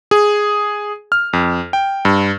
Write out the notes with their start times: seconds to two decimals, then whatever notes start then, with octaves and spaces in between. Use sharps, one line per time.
0.11 G#4
1.12 F6
1.33 F2
1.73 G5
2.05 G2